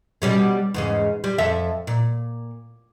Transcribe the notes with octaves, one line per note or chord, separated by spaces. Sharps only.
B2 G3 C#4
E2 G#2 C#3
G3
F2 A4 E5
A#2